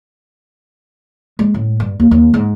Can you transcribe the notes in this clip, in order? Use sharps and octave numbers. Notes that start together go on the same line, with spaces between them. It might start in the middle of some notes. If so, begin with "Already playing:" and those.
G#3
A2
G2
D#2
D#2
G#2